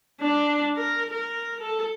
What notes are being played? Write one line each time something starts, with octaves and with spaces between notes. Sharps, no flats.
D4
A#4
A#4
A4